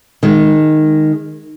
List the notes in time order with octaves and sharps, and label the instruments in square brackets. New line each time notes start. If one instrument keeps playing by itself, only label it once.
[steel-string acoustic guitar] D#3 G#3